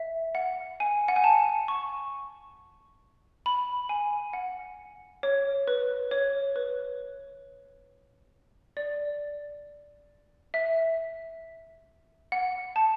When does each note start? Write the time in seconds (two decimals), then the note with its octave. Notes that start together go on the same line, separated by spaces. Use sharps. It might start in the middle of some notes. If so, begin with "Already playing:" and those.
Already playing: E5
0.35 F#5
0.80 G#5
1.08 F#5
1.16 G#5
1.24 A5
1.68 C#6
3.46 B5
3.89 G#5
4.33 F#5
5.23 C#5
5.68 B4
6.11 C#5
6.56 B4
8.77 D5
10.54 E5
12.32 F#5
12.76 A5